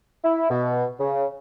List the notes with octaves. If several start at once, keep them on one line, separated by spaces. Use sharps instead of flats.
E4
B2
C#3